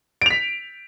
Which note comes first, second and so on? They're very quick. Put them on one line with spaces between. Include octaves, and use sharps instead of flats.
D7 F7 B6